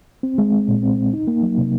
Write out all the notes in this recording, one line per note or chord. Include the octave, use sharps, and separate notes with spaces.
C4
G#3
G#3
A#2
C4
C4
D#4
A#3
F#3
C3